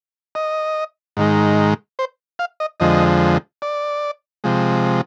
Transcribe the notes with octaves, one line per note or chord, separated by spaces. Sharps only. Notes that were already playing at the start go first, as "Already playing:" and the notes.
D#5
G#2 D#3 G#3
C5
F5
D#5
F2 D3 F3 G#3 D#5
D5
C3 F3 G#3